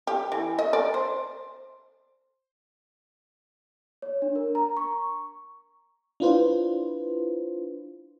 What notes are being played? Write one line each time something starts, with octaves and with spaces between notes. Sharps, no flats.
G4
E3
D#5
D5
C5
C#5
D4
A#4
A#5
C#6
D4 E4 F4 B4 C5